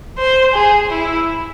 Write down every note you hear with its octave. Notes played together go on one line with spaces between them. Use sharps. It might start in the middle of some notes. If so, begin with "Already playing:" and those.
C5
G#4
E4